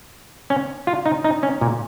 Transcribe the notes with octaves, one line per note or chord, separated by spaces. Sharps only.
C#4
F4
D#4
D#4
C#4
A#2